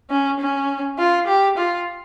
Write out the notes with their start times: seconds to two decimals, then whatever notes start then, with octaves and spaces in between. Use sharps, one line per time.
0.10 C#4
0.39 C#4
0.98 F4
1.27 G4
1.57 F4